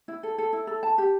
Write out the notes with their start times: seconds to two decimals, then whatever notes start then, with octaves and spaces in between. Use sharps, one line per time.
0.08 E4
0.23 A4
0.38 A4
0.53 E4
0.67 A4
0.83 A5
0.98 G4